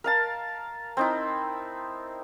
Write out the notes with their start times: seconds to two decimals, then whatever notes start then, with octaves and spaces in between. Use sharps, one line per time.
0.04 A#4 F5 A5
0.97 C4 D#4 E4